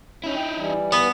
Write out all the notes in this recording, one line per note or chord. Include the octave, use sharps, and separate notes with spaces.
C#4 D#4 E4
G5
E3 G3
B3 B4 F#5